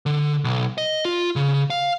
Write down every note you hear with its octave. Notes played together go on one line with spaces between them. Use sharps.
D3
B1
D#5
F4
C#3
F5